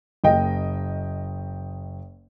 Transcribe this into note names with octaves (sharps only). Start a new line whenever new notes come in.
F#1 D#5 G5